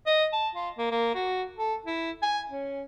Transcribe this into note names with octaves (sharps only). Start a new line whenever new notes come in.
D#5
A5
F4
A#3
A#3
F#4
A4
E4
G#5
C#4